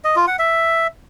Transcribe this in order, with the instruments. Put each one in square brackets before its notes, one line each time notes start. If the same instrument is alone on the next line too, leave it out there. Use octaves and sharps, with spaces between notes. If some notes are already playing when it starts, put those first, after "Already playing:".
[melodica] D#5
F4
F#5
E5